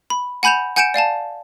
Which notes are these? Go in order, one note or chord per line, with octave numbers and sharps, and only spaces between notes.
B5
F#5 G#5 B5 G6 E7 F7
F#5 G#5 G6 C#7 D7 E7
D5 F5 G#5 A5